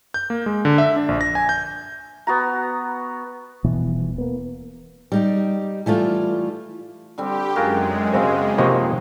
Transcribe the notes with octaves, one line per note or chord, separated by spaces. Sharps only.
G6
A#3
G#3
D3
E5
D4
A#1
A#6
G#5
G6
B3 F#4 A#5
D#1 B2 E3
A#3 B3
G3 D#4 G4
E3 G3 A3 F4
D3 G3 C4 G4
F#2 G#3 F4 F#4 G#4 A#4
C#3 B3 C4 G4 D#5
C3 D#3 F3 G#3 A#3 B3 D#5 C#6